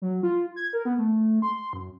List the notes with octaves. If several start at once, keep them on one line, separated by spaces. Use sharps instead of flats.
F#3
F4
G#6
A#4
B3
A3
C6
F#2